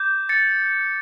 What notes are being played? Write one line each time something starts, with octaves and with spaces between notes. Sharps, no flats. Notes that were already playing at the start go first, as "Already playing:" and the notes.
Already playing: D6 G6
A6 C#7